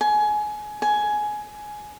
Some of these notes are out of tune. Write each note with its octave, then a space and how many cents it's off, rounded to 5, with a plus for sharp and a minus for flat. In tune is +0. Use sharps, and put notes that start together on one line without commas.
G#5 +20
G#5 +15